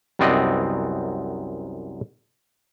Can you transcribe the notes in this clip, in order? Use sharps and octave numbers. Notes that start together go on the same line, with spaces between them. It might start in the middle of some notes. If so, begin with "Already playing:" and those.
C2 F#2 B3 C4 D5 D#5